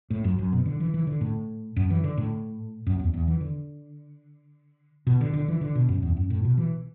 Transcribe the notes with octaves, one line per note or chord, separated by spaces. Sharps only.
A2
F#2
F#2
B2
D3
E3
E3
D3
A2
F#2
E3
D3
A2
F#2
E2
E2
E3
D3
B2
D3
D3
E3
D3
B2
F#2
E2
F#2
A2
B2
E3